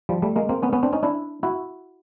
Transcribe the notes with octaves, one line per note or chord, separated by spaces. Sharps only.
F3 G3
G3 A3
G#3 A#3
A#3 C4
B3 C#4
B3 C#4
C4 D4
C#4 D#4
D4 E4
E4 F#4